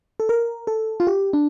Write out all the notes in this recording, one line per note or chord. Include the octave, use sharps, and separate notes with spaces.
A4
A#4
A4
F4
G4
D4